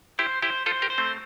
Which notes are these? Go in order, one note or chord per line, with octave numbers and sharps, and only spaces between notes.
E4 G4 C5
E4 G4 C5
F4 A4 C5
G4 A#4
C5
A3 C4